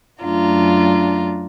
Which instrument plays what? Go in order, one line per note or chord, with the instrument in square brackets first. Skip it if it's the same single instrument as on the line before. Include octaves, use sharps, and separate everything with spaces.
[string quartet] F#2 A3 D4 F4 A#5